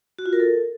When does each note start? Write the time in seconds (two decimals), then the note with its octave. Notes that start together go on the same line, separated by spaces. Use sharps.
0.19 F#4
0.26 F4
0.33 A#4
0.40 A4